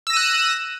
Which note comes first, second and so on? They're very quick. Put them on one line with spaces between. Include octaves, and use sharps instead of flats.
E6 A#6 D#7 F#6